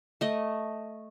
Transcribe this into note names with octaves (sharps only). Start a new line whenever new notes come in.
A3 D#5